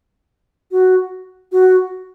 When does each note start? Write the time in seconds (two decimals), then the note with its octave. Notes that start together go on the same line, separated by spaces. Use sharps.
0.71 F#4
1.52 F#4